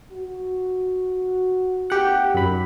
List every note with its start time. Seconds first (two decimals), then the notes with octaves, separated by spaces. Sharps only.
0.12 F#4
1.90 A#3 C4 D#4 G4 F#5
2.34 F#2 A#3 C#4 D#4 B5